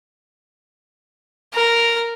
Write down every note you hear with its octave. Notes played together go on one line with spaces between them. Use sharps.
A#4